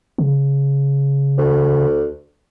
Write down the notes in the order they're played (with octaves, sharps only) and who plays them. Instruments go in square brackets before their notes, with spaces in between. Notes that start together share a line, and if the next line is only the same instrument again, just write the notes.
[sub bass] C#3
[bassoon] D2